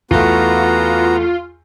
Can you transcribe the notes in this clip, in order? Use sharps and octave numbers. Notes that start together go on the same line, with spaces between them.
E2 A3 B3 F4 F#4 A#5